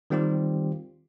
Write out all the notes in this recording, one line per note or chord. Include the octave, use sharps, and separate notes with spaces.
D#3 G3 C4 F4 G4